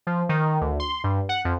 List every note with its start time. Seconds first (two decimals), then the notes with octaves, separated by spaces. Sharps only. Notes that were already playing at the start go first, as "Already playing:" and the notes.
0.07 F3
0.29 D#3
0.61 D2
0.80 C6
1.04 G2
1.29 F#5
1.45 F2